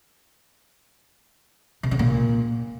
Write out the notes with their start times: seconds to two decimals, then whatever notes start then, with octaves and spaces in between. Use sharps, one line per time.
1.83 C3
1.91 C#3
1.99 A#2